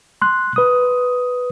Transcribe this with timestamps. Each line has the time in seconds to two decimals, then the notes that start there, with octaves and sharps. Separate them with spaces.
0.22 C6 F#6
0.56 B4 D#6